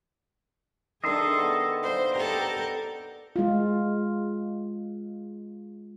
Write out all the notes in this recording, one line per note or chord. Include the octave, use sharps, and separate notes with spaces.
D#3 D4 G#4 A4 D#5 E5 C6
B3 C#6
C5 D5 F5
G4 A4 A#4
G#3 F4